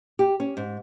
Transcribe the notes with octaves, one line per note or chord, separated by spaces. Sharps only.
G4
C#4
G#2